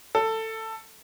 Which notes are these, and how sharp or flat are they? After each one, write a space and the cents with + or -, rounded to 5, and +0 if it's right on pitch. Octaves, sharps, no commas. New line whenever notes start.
A4 +15